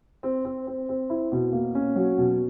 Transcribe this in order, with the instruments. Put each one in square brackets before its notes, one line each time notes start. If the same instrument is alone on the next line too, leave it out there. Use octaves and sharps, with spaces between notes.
[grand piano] C4
C4
C4
C4
E4
B2
A#3
C#4
F#3
B2